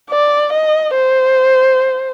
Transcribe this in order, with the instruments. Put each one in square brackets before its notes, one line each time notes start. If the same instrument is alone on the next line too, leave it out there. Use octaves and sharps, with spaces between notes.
[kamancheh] D5
D#5
C5